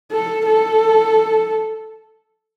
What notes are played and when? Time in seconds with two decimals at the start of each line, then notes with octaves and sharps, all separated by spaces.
0.12 A4
0.46 A4